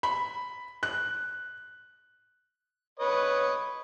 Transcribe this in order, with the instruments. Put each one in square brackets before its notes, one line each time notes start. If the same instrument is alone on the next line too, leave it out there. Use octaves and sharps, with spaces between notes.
[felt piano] B5
F#6
[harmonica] B4 C#5 D#5